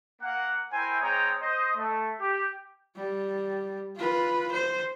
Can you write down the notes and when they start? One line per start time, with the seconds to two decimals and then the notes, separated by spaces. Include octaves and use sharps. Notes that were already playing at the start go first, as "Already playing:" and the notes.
0.22 A#3 F#5
0.72 E4 A#4 C5 G5 G#5
1.01 G#3 C4 C#5 G5 A#5 D#6
1.41 C5 D#5
1.77 A3
2.20 G4
2.96 G3
3.97 F4 B4
4.52 C5